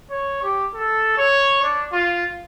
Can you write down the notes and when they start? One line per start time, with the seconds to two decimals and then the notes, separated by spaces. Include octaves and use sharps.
0.11 C#5
0.42 G4
0.74 A4
1.18 C#5
1.63 D4
1.92 F4